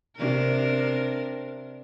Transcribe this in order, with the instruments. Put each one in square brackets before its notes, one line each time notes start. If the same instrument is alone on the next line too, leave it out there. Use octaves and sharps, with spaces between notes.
[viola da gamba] C3 D4 A#4